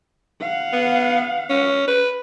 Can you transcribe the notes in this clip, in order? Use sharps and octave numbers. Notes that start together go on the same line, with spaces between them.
F5 F#5
B3
C#4
B4